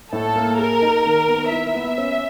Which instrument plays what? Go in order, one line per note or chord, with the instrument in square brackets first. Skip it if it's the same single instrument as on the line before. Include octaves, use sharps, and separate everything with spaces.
[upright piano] A2 [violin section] A4
[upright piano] A#3
[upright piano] G#4 [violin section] A#4
[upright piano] D#4
D#3
B3
[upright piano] E4 [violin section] E5
[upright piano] B3
C#4